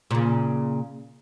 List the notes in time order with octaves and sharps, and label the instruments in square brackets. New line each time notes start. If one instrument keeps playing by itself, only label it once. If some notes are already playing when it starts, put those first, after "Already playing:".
[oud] A#2 C#3